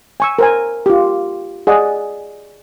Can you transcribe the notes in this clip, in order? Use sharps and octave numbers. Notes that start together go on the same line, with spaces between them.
G#5 C#6 E6
A#4 C5 G#5
F4 G4
G#4 D5 D#5 F#5 G#5